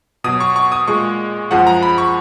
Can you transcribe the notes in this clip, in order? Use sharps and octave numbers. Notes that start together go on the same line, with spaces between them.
B2 F#3 D#6
C#6
C#6
D#6
A#2 G#3 C#6
F#2 F3 G#3 F#5
A#5
B5
C#6